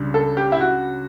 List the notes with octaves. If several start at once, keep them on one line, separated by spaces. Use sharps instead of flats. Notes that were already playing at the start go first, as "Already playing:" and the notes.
Already playing: C#2 C#3 G3 D4
A4
G4
E4
F#4